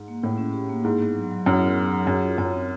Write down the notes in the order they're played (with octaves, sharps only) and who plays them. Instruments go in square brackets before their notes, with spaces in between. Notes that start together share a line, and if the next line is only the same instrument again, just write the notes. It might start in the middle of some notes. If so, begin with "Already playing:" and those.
Already playing: [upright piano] G#2
[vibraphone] A#3
[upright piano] A2 [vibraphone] E4
[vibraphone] C#4
G4
A#3
[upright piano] G#2 [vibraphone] E4
[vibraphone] B3
F#3
F#3
[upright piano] F#2 [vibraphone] E4
[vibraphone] B3
F#3
F#3
[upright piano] F#2 [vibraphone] G#4
[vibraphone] F4
[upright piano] F#2 [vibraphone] C#5
[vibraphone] C4